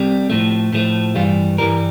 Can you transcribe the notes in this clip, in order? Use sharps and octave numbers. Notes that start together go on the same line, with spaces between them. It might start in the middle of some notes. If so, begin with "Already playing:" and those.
Already playing: C2 C3 G3
A2 F3 A3
A2 F3 A3
G2 E3 G3 F4
G2 E3 G3 A#4